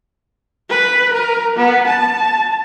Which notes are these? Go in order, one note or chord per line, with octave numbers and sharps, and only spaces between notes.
B4
A#4
B3
A5